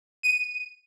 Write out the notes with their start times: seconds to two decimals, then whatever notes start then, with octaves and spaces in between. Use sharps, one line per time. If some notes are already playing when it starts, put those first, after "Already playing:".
0.23 D#7